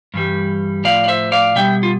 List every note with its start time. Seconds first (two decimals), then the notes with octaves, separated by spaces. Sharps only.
0.14 G2 E3 G3
0.84 A2 F3 D5 F5
1.04 D5
1.08 C5 E5
1.32 D5 F5
1.56 B2 G3 E5 G5
1.83 F4